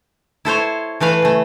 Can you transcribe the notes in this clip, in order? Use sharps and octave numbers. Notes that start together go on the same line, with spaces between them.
E4 A4 C5 C#5
E3 A3 B4 F5
C#3 A3